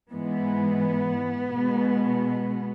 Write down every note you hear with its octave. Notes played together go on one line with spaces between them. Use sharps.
G#2 E3 G#3 B3
B2 G#3